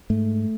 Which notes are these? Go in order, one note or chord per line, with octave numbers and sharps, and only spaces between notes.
G#2 A3